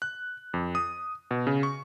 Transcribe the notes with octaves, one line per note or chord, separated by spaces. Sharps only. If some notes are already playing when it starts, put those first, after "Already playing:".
F#6
F2
D#6
B2
C#3
C#6